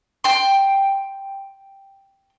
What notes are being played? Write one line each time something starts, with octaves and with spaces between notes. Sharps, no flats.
G5 C6